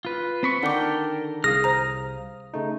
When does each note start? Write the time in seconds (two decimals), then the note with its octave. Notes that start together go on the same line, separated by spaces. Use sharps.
0.05 F4 B4
0.43 C4 B5 C#6
0.63 D3 D#3 D4 A4 A#4 F#5 G5 D6
1.44 C2 G#4 F5 D#6 F6 A#6
1.64 C5 A#5
2.54 C#3 A3 D#4